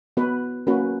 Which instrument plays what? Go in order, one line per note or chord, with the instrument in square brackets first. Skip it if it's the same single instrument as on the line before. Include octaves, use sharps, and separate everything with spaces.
[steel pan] B3 F#4 B4
A#3 C#4 F#4 B4